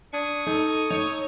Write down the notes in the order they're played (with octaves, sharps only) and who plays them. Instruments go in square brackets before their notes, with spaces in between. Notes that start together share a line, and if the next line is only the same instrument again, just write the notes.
[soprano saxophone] D4 [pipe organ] C#6 D#6 G#6
[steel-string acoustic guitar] D#4 [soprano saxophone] A4
[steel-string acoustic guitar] D#4 [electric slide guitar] C#5